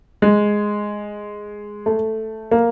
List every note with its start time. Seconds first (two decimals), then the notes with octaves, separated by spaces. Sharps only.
0.22 G#3
1.86 A3
2.51 A#3